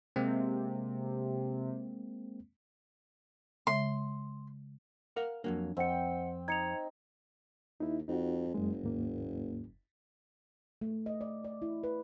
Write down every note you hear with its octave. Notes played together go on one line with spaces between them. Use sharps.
C3 G#3 A#3 C4
C#3 G#3 E5 C6
A#4 F5 F#5
F2 F#3 A#3 D4
F2 C4 D#5 F#5 G5 C#7
D#4 G#6 C#7 F7
D#2 D#4 E4
F2 D#4 F#4
F#1 F#2 G#3
D#2 G#2 A#3
A3
D#5
D5
D5
E4
B4